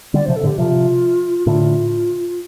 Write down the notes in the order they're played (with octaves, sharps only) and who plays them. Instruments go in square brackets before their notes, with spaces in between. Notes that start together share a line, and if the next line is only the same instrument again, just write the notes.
[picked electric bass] D3 G3 [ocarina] D5
[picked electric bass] C3 F3 [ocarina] C5
[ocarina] A4
[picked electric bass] A2 D3
[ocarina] G4
[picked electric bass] C3 F3 [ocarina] F4
[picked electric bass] A2 D3 [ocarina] F4